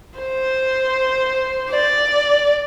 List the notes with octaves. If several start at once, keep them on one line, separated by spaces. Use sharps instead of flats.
C5
D5